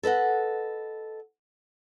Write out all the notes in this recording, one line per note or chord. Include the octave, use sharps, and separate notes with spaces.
A4 B4 D#5 F#5